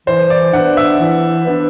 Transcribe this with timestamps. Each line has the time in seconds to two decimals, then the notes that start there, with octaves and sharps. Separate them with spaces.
0.07 E3 C5
0.30 D5
0.53 B3 D4 F#5
0.77 E5
1.00 E3
1.46 B3 D4